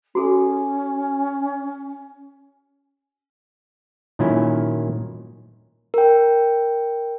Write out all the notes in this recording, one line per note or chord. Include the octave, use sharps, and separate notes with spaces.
C#4 F#4 G#4 A4
A#2 D#3 F#3 C#4 E4
A#4 G5